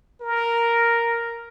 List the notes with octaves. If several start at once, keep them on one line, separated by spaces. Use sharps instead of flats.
A#4